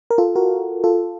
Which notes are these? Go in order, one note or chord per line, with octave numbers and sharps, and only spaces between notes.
A#4
F4 A4
F#4 A#4
F4 A4